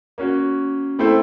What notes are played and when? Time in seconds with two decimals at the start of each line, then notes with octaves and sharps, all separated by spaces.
0.18 A#3 C#4 F#4
0.99 A3 C4 E4 A4 C5